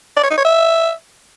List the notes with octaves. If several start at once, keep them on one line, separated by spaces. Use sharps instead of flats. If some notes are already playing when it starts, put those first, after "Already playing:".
D5
C#5
D#4
C#5
E5